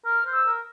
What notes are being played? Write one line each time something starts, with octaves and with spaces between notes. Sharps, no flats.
A#4 F6
C5
E6
A#4